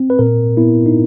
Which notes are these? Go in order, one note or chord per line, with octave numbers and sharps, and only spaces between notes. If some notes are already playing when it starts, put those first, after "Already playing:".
Already playing: C4
B4
A#2 A#4
B3 E4
D#4